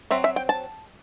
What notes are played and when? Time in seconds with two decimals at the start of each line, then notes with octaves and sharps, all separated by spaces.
0.11 F#3 C4 E5
0.24 E5
0.36 G5
0.49 A5